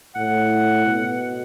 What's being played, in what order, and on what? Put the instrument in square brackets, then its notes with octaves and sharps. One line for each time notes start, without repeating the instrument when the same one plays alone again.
[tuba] A2 [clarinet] F#5
[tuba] B2